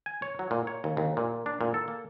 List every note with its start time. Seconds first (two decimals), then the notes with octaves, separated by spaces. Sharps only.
0.06 G#5
0.22 C#5
0.39 F#3
0.51 A#2
0.67 C#5
0.84 D#2
0.97 D#2
1.17 A#2
1.46 D4
1.61 A#2
1.74 A4
1.88 A#3